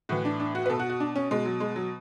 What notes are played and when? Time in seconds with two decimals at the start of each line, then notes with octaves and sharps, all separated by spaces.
0.09 A2 E3 F#4
0.25 D4
0.40 D4
0.55 F#4
0.66 B4
0.70 B2 A4
0.79 F#4
0.90 F#4
1.00 D4
1.16 C#4
1.31 B2 G#3
1.45 F#3
1.60 G#3
1.76 F#3